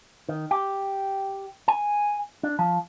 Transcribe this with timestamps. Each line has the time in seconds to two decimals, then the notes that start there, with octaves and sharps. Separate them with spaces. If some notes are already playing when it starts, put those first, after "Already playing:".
0.29 D#3
0.51 G4
1.68 G#5
2.43 D4
2.59 F3